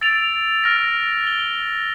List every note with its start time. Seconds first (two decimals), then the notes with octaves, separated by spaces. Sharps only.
0.01 E6 A6 D7 F7
0.62 F6 A#6 D7
1.23 A6 D7 G7